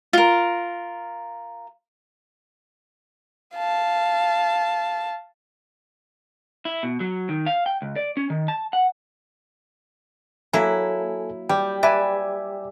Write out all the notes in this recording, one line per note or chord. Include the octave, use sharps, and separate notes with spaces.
F4 A#4
F5 A5
E4
B2
F#3
D#3
F5
G5
C#2
D5
C#4
D#3
A5
F#5
F#3 A#3 E4 A4 G#5
G3 G5
B4 D5 E5 G#5